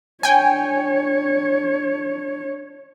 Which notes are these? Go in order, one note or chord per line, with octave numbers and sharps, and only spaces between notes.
D4 C#5 G5 G#5